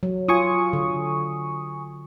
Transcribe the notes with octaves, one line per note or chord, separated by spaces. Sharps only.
F#3
F4 G#5 C#6 D#6
D3